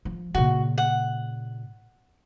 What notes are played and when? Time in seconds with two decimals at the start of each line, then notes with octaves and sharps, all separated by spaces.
0.05 F3
0.35 A#2 C#3 F#4
0.78 F#5